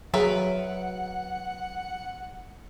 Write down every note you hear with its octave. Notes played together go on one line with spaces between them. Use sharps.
F#3 G#4 A#4 B4 C#5 E5 F#5